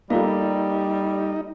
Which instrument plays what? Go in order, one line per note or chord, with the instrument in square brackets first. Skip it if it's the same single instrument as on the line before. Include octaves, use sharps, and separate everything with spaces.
[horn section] G3 [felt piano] A#3 A4 [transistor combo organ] D#4 [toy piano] F4 F5